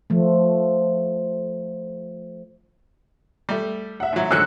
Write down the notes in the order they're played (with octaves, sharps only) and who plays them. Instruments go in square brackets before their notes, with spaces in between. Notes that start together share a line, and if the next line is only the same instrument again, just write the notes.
[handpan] F3 A3
[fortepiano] G3 A3
[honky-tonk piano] E5 F#5
[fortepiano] G#2 F#3
[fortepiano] G#2 D3 F#3 [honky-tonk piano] E6 F#6 C#7